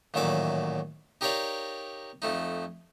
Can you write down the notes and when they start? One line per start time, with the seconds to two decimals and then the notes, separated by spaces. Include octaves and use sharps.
0.14 A1 A#2 D#3 F#3 E5 D6
1.21 D#4 G4 A#4 C#5 D5 F5
2.22 F2 A3 D#4